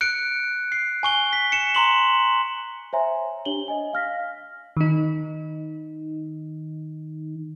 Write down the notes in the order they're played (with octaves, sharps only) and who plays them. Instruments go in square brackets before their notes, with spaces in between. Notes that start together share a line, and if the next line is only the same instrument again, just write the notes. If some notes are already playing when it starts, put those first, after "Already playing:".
[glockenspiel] F#6 C#7 D7
C7
G#5 C#6 G7
B6
C#7 E7
A#5 C6 F#7
[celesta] C5 C#5 E5 G#5 A#5 C6
D4 G4 C#5 F#7 G7
D#5 G#5
F5 F6 A#6 B6
[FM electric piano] D#3 D#4